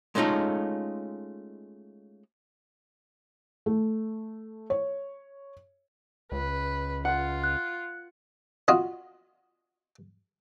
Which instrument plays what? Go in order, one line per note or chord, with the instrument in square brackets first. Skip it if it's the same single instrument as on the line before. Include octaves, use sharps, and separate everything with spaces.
[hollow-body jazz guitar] G#3 A3 C#4 D#4 F4 A4
[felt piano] A3
C#5
[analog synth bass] C#2 [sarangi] B4
[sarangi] F4 [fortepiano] F#5
[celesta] F#6
[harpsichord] F4 F#4 D#5